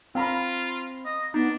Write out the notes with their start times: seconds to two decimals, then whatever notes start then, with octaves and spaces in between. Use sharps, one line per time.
0.15 C4 F4 F5 A#5 B5
1.05 D#5
1.34 B3 D4 D#4